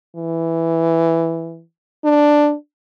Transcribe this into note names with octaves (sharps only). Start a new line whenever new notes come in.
E3
D4